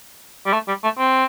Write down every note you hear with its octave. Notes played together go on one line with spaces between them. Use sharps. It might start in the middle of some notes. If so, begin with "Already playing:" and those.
G3
A3
G3
A3
C4